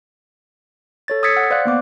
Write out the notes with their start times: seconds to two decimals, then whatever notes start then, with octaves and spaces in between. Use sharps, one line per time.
1.08 A4 C#5 A6
1.23 D#6 E6 G#6 A6 B6 C#7
1.37 F#5
1.50 C5 D5 F5 F#6
1.65 A#3 B3 D6